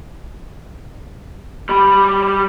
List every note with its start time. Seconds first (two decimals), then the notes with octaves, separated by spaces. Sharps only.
1.69 G3 B5